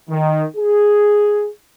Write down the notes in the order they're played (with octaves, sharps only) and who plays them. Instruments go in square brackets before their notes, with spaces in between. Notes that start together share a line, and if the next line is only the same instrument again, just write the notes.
[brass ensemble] D#3
G#4